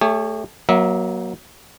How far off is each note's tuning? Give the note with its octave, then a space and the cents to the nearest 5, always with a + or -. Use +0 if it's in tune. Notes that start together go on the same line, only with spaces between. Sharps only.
A3 +0 G4 +45 C#5 +20
F#3 +0 A#3 +30 E5 -25